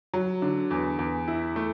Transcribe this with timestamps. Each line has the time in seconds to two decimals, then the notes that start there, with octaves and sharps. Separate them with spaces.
0.14 F#3
0.42 D3
0.71 E2
0.99 E2
1.28 E4
1.56 A3